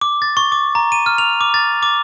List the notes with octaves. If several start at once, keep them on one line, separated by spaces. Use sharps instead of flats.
D6
A6
C#6
D6
A#5
D#7
F6
F7
D6
A6
D6